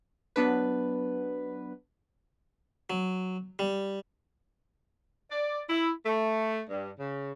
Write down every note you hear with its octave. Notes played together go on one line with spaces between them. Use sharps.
F#3 B3 D4 B4
F#3
G3
D5
E4
A3
G2
C#3